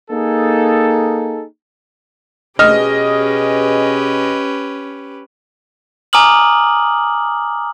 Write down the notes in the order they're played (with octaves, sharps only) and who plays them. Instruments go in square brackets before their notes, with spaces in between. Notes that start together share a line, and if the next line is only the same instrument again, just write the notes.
[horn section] A#3 D#4 G#4 A4
[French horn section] B2 G#4 [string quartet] C#4 G4 B4 [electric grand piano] D#5 [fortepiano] F6
[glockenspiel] G#5 A#5 D6 D#6 F6 F#7